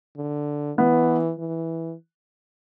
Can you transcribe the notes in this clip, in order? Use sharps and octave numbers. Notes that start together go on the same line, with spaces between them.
D3
E3 B3
E3